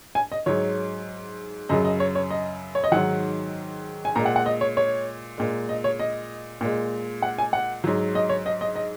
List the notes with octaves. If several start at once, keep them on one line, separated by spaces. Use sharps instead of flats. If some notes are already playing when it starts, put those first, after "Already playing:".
G#5
D#5
G#2 F#3 C#5
F#2 C#3 F#3 D#5
D#5
C#5
C#5
D#5
C#5
D#5
G#2 D#3 F#3 F#5
G#5
A#2 G#3 A#5
F#5
F#5
D#5
C#5
C#5
A#2 G#3
D#5
C#5
D#5
A#2 G#3
F#5
G#5
F#5
G#2 F#3
D#5
C#5
D#5
D#5
D#5